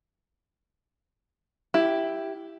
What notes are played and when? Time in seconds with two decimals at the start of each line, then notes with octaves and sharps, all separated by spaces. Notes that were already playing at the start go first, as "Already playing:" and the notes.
1.74 E4 G4